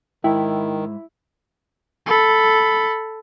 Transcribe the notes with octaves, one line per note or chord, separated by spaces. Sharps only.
G#2 D#3 E4 G5
A4 B5